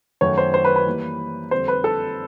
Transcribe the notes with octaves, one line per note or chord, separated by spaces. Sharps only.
F#2 D#3 F#3 A3 C#5
C5
C5
B4
B4
E3 G3 A#3
F2 D3 G3 C5
B4
A4